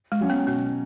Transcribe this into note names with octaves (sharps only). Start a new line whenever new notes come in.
G#3
F#3 C#4
B3
B2 B3